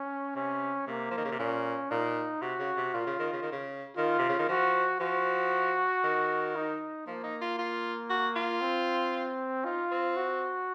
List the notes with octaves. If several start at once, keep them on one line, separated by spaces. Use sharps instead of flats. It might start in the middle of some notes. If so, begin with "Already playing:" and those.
Already playing: C#4
C3 C#4
C3 A#3
F3
D#3
C#3
C3
A#2 C#4
A#2 D#4
C3 F#4
C#3
C3
A#2 F4
C#3
D#3
C#3
D#3
C#3
D#3 F4
C3
C#3
D#3
F3 F#4
F3 F#4
D#3
D#4
F3 A#3
D#4
F4
F4
F#4
F4
C4
D#4 F4
C4
F#4